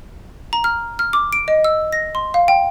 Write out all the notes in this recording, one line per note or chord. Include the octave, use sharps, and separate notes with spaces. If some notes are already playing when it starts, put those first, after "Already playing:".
A#5
F6
F6
D6
D7
D#5
E6
A#6
C6
F5
G5